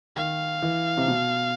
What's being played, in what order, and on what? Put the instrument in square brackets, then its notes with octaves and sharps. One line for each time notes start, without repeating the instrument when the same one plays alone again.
[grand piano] D#3 [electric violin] F5
[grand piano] E3
C3
B2